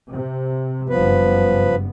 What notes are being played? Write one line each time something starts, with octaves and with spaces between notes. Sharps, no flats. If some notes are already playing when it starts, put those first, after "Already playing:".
C3
F#1 G2 F3 B3 B4